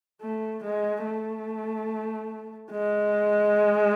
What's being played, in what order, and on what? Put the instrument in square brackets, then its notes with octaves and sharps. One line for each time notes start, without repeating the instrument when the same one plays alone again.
[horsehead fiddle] A3
G#3
A3
G#3